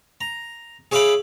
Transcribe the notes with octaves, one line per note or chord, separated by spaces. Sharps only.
A#5
G#4 C#5 E5 F5 B5 D6